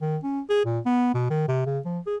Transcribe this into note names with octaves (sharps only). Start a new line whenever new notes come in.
D#3
C#4
G#4
A#2
B3
B2
D#3
C3
C#3
F3
G#4